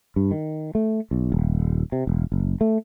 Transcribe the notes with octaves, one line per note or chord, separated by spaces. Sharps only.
G2
D#3
A3
B1
D#1
C3
E1
F#1
A3